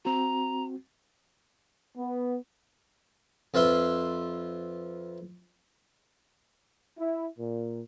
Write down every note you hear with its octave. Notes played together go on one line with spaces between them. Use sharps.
C4 F#4 A#5
B3
F2 F4 B4 E5 C6
E4
A#2